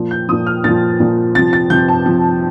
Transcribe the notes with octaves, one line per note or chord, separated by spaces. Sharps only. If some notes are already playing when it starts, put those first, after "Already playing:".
Already playing: A#2 F3
G6
A#2 F3 D#6
F6
A#2 F3 A6
A#2 F3
C3 F3 A6
A6
C3 F3 G6
A5
C3 F3